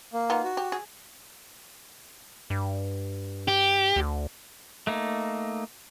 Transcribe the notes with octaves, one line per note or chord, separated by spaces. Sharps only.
A#3
B3 D#4 F4
F#4
G4
G#4
G2
G4
D2
A3 A#3 D#4